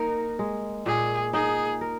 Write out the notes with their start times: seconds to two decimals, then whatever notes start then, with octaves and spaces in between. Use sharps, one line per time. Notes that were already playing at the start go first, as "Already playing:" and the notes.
Already playing: A#3 D#4 A#4
0.39 G#3
0.86 A#2 G#4
1.33 D#4 G#4
1.81 A#4